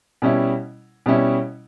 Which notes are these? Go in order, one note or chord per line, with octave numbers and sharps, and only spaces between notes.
B2 G3 C#4 E4
B2 G3 C#4 E4